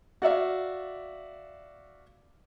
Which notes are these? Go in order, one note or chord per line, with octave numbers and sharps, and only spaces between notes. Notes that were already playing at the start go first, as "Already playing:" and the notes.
F#4 D5 E5 F5